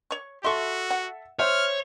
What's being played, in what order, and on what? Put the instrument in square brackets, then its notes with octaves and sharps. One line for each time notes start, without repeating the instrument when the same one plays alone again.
[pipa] C#5 C#6
[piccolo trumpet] F#4 [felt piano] A4 E5 [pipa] C6 C#6
[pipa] F#5
[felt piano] C5 E5 [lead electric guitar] C#5 [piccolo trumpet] F6